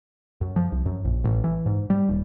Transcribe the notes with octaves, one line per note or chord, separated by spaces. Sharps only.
F#2
F3
C2
F#2
A#1
A1
E3
G#2
G3
D#1